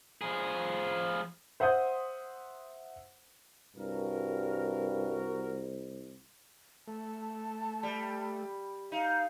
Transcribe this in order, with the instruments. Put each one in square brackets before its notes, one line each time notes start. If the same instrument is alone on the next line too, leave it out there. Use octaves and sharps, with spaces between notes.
[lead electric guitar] F3 G#4
[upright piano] C5 E5 F#5 C6 D#6 G6
[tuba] C2 [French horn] G2 [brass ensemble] F#4 A#4
[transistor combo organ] A3 [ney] A5
[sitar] G3
[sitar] D#4 [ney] F5